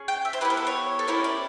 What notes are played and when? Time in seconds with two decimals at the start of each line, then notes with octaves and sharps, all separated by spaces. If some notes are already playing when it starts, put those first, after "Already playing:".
Already playing: C#4 G#4
0.08 G5
0.25 E5
0.33 C5
0.41 B3 E4 G4 B4
0.50 A#4
0.57 A4
0.67 C#5
0.99 A4
1.08 C#4 E4 G4 A#4
1.24 D5